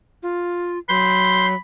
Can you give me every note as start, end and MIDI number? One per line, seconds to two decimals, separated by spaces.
0.23 0.78 65
0.89 1.54 54
0.89 1.58 83
0.89 1.46 84
0.89 1.46 91